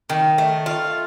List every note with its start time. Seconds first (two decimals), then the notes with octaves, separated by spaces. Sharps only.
0.09 D#3
0.38 A3
0.66 F4